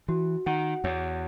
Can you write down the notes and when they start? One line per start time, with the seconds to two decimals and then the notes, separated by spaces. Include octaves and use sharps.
0.08 E3 F#4
0.46 D#3 F#5
0.84 E2 C#5